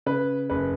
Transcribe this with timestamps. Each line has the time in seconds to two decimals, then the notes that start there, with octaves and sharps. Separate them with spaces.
0.06 C#3 B4
0.50 F#1 B4